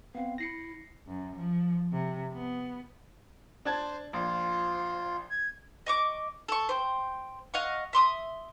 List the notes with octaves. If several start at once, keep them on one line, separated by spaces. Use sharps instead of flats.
B3 C4 F5
E4 A#6 C7 C#7
F#2
F3
C3
B3
D4 C5 A5 G#6
A#1 F4 C5
G#6
D#5 C#6 D6
A4 C#6
C5 G5
D#5 F5 F#5 C#6
E5 C6 D6 D#6